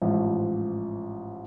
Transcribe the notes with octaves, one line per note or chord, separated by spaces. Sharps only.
A1 G#2 F3